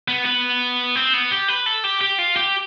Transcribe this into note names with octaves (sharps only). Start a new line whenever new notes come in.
B3
B3
C4
B3
G4
B4
A4
G4
G4
F4
G4